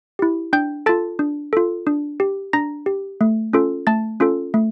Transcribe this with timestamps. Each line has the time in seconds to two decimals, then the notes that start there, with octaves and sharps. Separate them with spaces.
0.19 E4 G4
0.53 D4 G5 G6
0.86 F4 A4 A5 A6
1.19 D4
1.53 F4 A4
1.87 D4
2.20 G4
2.53 D4 A#5 A#6
2.86 G4
3.21 A3
3.53 C#4 F4 A4
3.87 A3 A5 A6
4.20 C#4 F4 A4
4.54 A3